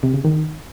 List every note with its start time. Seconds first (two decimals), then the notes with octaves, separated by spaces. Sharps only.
0.03 C3
0.14 C#3
0.24 D#3